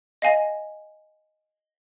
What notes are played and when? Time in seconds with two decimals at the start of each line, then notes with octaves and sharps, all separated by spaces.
0.22 D#5 F5 G#5 A#6